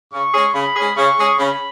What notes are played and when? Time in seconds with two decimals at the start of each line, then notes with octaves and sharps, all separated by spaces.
0.12 C#3 C#6
0.33 G#3 C#4 G#4
0.54 C#3 B5
0.75 G#3 C#4 G#4
0.96 C#3 C#6
1.18 G#3 C#4 G#4
1.38 C#3 B5